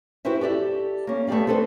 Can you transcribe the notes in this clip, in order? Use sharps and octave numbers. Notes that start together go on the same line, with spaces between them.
E4 F#4 G4 B4 C5 E5
G4 A4 D5 E5
A#3 C#4
A3 B3 G4 D5 F5
C4 D4 A4 B4 C5